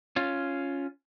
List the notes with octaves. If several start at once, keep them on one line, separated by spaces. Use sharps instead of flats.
C#4 F4